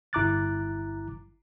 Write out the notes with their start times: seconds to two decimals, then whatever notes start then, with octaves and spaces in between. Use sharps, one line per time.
0.13 G1 E4 A#5 D6 F#6 A6